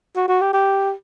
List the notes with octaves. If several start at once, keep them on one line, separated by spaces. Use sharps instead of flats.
F#4
F#4
G4
G4